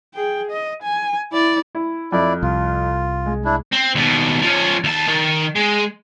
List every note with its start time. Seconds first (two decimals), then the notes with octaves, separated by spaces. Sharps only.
0.15 G#4 G5
0.50 D#5
0.82 G#5
1.32 E4 D5
1.75 E4
2.12 F2 E4 D5
2.43 C2 F4
3.26 G#3
3.45 D4 E4
3.72 C4
3.95 D#2 B2
4.42 F3 C#4
4.84 D#2 A5
5.08 D#3
5.56 G#3